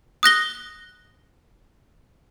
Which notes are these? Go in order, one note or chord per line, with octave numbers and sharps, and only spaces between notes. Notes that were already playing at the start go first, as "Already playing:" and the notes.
D#6 F#6 A#6 G7